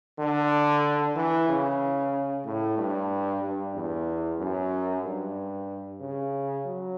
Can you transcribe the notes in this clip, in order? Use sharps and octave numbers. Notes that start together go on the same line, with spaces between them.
D3
E3
C#3
A2
G2
G2
E2
F#2
G2
C#3
F#3